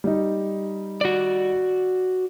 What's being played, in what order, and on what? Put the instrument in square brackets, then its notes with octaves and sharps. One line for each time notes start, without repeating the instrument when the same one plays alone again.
[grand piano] G3 D#4
[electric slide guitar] F#4 D5